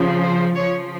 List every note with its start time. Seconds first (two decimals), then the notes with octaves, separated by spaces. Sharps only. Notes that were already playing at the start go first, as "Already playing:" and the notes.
Already playing: C#3 F3
0.22 C5
0.56 C#3 F3 C#5